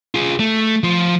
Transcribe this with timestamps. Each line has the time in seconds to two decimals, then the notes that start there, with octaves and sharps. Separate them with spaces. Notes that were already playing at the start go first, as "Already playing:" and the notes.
0.15 F4 G#4
0.39 A3
0.83 F3 F4